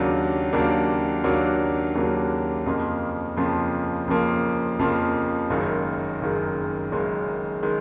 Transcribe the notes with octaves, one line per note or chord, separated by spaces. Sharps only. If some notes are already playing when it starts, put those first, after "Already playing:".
Already playing: D#2 C#3 F#3 A#3 D4
D#2 C#3 F#3 A#3 D4
D#2 C#3 F#3 A#3 D4
D#2 C#3 F#3 A#3 D4
F2 C#3 F3 A#3
F2 C#3 F3 A#3
F2 C#3 F3 A#3
F2 C#3 F3 A#3
F#1 F#2 D#3 G#3
F#1 F#2 D#3 G#3
F#1 F#2 D#3 G#3
D#3 G#3